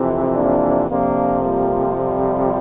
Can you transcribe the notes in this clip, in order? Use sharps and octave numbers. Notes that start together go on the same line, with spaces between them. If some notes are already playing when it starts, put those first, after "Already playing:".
Already playing: F2 C3 E3
A#3 D4
F2 C3 F3 A#3 D4
G3 A#3
G3